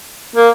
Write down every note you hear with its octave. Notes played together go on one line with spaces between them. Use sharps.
A#3